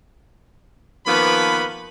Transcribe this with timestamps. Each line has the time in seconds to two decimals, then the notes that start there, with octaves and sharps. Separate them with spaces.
1.07 D#3 F3 A#3 B3 B4 B5